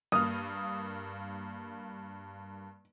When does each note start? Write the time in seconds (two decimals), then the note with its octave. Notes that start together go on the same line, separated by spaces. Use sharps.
0.12 G2 A#3 D#6 F6